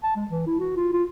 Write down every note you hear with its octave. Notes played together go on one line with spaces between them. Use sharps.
A5
G#3
E3
E4
F#4
F4
F4